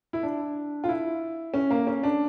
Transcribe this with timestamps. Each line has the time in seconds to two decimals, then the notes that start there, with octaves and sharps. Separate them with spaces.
0.13 E4
0.23 D4
0.84 F4
0.88 E4
1.54 C#4
1.71 A#3
1.87 C#4
2.03 D4